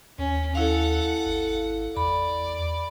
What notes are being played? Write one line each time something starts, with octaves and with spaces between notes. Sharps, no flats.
D#2 C#4
E4 A4 F5 F#5
G#1
E2 D5 B5